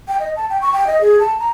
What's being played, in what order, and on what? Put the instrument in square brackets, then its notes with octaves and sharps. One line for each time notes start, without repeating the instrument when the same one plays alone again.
[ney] G5
D#5
A5
G5
C#6
G5
D#5
G#4
A5
A#5